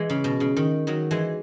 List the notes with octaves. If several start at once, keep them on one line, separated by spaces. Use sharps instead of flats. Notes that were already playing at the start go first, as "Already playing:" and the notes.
Already playing: E3 G#3
C#3
B2
C#3
D#3
D#3 F#3
E3 G#3